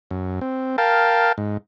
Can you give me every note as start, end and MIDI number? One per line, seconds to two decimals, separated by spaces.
0.11 0.40 42
0.41 0.76 60
0.78 1.32 70
0.78 1.32 77
0.78 1.32 79
0.78 1.32 81
1.38 1.57 44